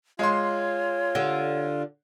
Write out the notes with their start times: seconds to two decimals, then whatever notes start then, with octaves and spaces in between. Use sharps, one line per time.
0.19 G#3 F4 C#5 C6
1.15 D3 G4